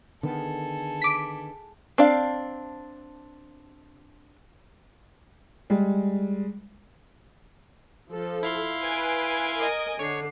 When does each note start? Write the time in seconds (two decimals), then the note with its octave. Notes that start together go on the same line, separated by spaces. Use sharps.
0.23 D3 D#3 B3 G#4 A4
1.02 D6 B6
1.98 C4 D4 F5
5.70 G3 G#3
8.10 F3 A4
8.43 E4 F5 C6
8.83 B4 G#5 D7
9.56 A#4 D#5
9.99 D3 C#5 C7